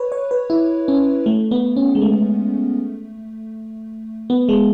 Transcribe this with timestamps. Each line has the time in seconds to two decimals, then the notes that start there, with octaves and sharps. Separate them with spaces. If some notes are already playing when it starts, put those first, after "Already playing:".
Already playing: B4 C#5
0.12 C#5
0.31 B4
0.50 E4
0.88 C#4
1.26 A3
1.51 B3
1.76 C#4
1.95 G#3
2.02 A3
4.30 B3
4.49 G#3